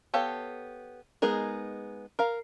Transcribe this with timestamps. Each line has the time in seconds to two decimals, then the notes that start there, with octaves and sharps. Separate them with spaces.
0.14 B3 G4 A4 C#5 F5
1.22 G#3 B3 D#4 G#4 A#4
2.19 A#4 F5